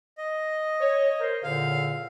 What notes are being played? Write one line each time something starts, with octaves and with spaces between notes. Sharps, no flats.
D#5
C#5
A#4 C5
E2 A#2 D3 F5